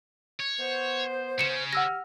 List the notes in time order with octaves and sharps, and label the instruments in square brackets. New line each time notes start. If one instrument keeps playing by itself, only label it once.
[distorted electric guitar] C#5
[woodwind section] B3 C5
[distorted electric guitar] C#3 C#4 [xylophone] C#7 E7
[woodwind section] G4 F6 [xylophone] F#5 E6 A#6